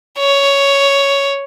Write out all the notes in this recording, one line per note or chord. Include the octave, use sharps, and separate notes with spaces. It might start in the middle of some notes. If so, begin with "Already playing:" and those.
C#5